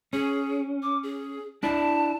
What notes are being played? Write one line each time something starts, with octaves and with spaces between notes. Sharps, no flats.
C#4 G#4
D6
G#4
D4 E4 D5 A5